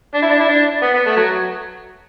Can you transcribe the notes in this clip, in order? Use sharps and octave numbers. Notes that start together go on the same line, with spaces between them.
D4
E4
D4
E4
D4
B3
B3
A3
F#3